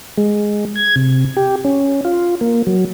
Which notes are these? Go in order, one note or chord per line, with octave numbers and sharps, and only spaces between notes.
G#3
G#6
C3
G4
C#4
F4
A#3
F#3